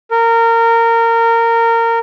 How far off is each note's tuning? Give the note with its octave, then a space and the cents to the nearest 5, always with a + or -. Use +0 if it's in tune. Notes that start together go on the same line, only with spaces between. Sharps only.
A#4 -20